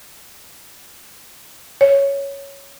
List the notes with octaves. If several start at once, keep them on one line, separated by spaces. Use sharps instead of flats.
C#5